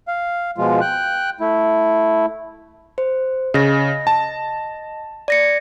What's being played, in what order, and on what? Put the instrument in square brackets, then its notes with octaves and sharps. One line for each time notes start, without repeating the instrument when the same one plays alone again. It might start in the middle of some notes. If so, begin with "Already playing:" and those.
[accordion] F5
B2 F3 G#3 F4
G5 F#6
A3 E4
[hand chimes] C5
[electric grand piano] C#3 [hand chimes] D#5 A#6
[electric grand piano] A5
[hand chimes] D5 A#6 C#7